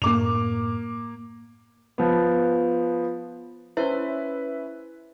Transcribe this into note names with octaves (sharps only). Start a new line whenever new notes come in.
F#2 A2 A#3 D6 F7
F3 B3
C#4 E4 B4 C5 E5